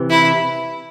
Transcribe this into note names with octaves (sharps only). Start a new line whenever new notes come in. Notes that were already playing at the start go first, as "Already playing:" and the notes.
Already playing: C3 E3
E4